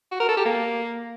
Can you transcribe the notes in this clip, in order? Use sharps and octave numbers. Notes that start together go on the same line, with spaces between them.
F#4
A#4
A4
G4
A#3